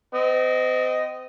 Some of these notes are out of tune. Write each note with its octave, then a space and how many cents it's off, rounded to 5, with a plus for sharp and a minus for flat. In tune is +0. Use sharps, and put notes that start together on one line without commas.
C4 -35 D#5 +0